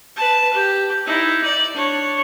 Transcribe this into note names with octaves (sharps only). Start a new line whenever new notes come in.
B4 A5
G4
D#4 E4
D5
D4 C#5